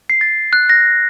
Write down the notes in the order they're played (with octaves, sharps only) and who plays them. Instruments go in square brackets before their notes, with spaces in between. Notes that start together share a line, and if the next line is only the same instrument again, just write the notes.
[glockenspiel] C7
A6
F#6
A#6